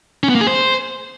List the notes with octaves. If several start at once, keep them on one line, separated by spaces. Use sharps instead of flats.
C#4
B3
A#3
G#4
C5